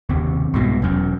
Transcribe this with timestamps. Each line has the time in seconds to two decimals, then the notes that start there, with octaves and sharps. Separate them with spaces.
0.09 F#1 D#2 C3
0.54 C2 G#2 B2
0.82 E1 F#2